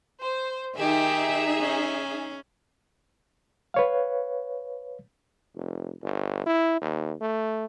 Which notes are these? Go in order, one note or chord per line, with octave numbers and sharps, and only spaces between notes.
C5
D#3 D#4 G4 G#4 E5
C#4
B4 C#5 F5
F1
G1
E4
D#2
A3